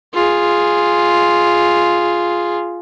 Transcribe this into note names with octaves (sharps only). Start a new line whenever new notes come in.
F4 G#4